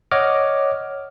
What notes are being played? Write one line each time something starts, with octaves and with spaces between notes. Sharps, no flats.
C#5 D#5 F#5 D6 F6